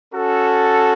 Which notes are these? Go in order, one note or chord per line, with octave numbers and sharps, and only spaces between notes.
C#4 F#4 A4